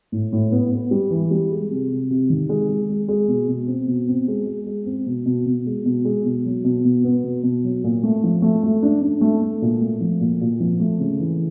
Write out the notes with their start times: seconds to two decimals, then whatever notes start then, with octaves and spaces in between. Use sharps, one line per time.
0.12 A2
0.32 A2
0.52 B3
0.72 B3
0.91 G3
1.11 E3
1.31 G3
1.51 G#3
1.70 C3
1.90 C3
2.10 C3
2.30 D#3
2.49 G#3
2.69 G#3
2.89 G#3
3.08 G#3
3.28 B2
3.48 B2
3.68 C4
3.88 B2
4.08 C4
4.28 G#3
4.47 G#3
4.67 G#3
4.86 C4
5.06 B2
5.26 B2
5.46 B2
5.66 G#3
5.85 B2
6.05 G#3
6.25 B2
6.45 F#3
6.64 B2
6.85 B2
7.04 B3
7.24 B2
7.43 B2
7.64 F#3
7.84 A#2
8.03 A3
8.24 F3
8.42 A3
8.63 A3
8.83 D4
9.02 D4
9.21 A3
9.42 A3
9.62 A#2
9.81 A3
10.01 F3
10.20 A#2
10.41 A#2
10.60 F3
10.80 A3
10.99 C#3
11.20 E3